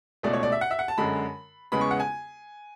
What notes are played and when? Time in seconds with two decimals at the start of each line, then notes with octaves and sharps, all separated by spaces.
0.23 C#2 B2 A3 D5
0.33 C#5
0.43 D5
0.52 E5
0.61 F#5
0.71 E5
0.79 F#5
0.88 A5
0.98 F#2 D3 G#3 B5
1.72 E2 C#3 G#3 B3 B5
1.81 C#6
1.91 F#5
2.00 G#5